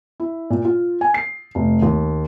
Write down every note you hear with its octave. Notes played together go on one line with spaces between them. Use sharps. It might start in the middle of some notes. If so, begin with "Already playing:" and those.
E4
A#2
F4
G#5
C7
F1
D#2